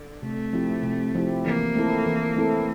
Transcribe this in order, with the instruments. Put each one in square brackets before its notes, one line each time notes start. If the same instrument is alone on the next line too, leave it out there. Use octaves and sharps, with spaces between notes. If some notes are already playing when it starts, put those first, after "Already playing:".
Already playing: [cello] D3
[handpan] C3 [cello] A3
[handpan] F3 C4 E4 G4
C3
F3 C4 E4 G4
[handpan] E3 [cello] A#3
[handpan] A3 C4 E4 A4
E3
A3 C4 E4 A4